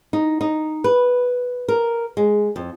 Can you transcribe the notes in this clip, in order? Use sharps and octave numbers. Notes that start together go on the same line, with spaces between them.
D#4
D#4
B4
A#4
G#3
F2